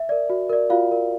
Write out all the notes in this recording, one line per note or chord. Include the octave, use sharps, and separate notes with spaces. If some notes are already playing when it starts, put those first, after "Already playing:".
Already playing: E5
A#4 D5
F#4
A#4 D5
F4 F#4 F5
A#4 D5